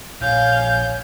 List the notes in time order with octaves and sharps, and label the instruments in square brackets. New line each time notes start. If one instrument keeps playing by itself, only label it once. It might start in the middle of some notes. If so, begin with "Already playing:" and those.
[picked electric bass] A#1 A#2 [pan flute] C#5 [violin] F5 G#5 [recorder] G6